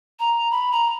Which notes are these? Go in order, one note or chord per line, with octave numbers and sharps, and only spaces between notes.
A#5
B5
A#5